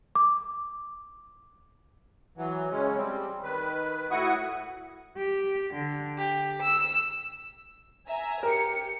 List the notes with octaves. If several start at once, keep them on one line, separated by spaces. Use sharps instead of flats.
D6
E3 F#3
C#3 G#3 C#4
G3 C4
D#3 B4
A2 E4 F#4 F#5 C#6 D#6
G4
D3
G4
E6
E5 G#5 A#5
G4 A#4 C#7